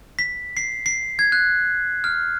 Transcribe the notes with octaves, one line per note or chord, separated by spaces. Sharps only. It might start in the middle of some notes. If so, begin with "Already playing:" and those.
B6
C7
C7
G#6
F#6
F6